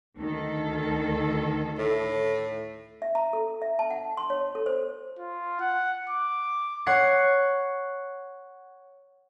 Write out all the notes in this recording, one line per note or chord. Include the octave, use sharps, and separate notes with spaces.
D2 D#3 A4
A2
E5
A#5
A4
E5
A5
F#5
C6
C#5
A4
C5
F4
F#5
D6
C#5 F#5 C#6 C7 C#7